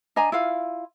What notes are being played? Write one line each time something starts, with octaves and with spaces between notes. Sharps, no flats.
D4 D#5 G#5 A#5
E4 F4 F5